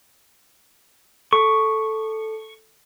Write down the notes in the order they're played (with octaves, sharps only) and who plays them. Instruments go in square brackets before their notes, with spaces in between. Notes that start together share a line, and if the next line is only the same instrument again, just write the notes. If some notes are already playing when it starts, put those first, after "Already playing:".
[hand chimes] A4 [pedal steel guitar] C#6